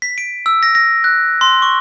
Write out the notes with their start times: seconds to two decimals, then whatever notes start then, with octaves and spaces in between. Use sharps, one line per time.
0.02 B6
0.18 D7
0.46 E6
0.63 A#6
0.75 A#6
1.04 F#6
1.41 C6
1.62 C#6